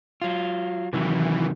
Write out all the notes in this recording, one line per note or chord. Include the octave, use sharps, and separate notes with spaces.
F#3 F4
C3 D#3 E3 F#3